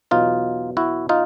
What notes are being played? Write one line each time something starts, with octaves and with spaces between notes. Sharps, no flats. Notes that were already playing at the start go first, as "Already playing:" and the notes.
E2 B2 F#3 D#4 F4
E4 F#4
D#4 F4